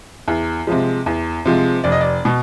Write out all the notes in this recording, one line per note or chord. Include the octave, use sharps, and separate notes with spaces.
E2
C3 F3 G#3
E2
C3 F3 G#3
F1 D5
D#5
D5
B2